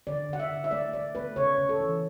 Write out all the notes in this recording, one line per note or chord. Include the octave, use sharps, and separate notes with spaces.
D3 D5
D3 F#5
E5
D3
E5
A3 D5
A3 D5
A3 B4
C#3 C#5
C#3
A4
E3